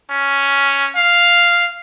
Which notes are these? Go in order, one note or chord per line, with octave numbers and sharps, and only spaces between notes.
C#4
F5